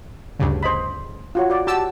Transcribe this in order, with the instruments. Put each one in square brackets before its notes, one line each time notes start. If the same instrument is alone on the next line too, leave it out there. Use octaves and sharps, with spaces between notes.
[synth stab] D2 G2 C#3
[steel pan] C5 D#5 B5
F4 F#4 C#5
F#4 D5
[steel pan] F#4 [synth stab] G4 A5 E6